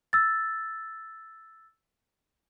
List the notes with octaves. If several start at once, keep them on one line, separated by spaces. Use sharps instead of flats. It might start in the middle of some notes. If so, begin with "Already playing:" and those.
E6 A6